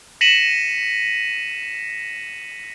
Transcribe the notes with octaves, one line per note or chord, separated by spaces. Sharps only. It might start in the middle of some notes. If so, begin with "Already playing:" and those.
A#6 B6 C#7 D#7 E7 F#7